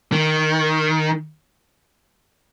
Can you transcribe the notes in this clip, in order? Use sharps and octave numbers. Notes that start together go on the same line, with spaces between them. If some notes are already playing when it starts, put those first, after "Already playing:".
D#3